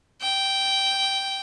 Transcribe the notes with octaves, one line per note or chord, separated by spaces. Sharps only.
G5